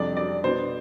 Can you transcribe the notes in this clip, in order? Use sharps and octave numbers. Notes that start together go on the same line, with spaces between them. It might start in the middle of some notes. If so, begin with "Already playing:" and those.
Already playing: F2 C3 G3 D4 D5
D5
B2 B3 D4 C5